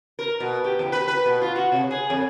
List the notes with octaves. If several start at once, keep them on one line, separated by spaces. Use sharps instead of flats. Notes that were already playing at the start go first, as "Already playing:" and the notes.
A#4
B2
G4
E2
B4
B4
B2
F4
F#4
C3
G#4
F2